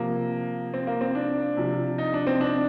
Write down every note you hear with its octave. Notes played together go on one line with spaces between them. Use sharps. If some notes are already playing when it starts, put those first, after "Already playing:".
Already playing: C3 F3 A#3
C4
A#3
C4
D4
C3 F3
D#4
D4
C4
D4